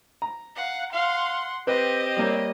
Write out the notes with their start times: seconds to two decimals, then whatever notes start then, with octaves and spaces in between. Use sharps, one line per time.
0.22 A#5
0.55 F5 F#5
0.93 F5 F#5 C6
1.67 C4 G4 B4 D#5
2.17 G3 A#3 C#5